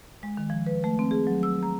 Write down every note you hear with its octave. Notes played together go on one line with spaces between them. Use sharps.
G#3
D#3
F3
B4
A3
C4
G#4
F#3
E6
A#5